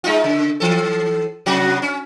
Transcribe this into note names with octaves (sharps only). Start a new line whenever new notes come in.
G#3 D#4 F4
C#3
E3 A4
C3 F#3 F#4
C#4